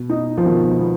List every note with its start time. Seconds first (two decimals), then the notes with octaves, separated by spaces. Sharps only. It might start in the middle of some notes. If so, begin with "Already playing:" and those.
Already playing: B2
0.10 D#4
0.38 F3
0.45 B2 D#3
0.80 B3